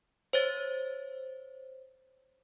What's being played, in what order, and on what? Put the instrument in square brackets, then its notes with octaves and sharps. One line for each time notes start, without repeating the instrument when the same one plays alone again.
[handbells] C5 C#5 A6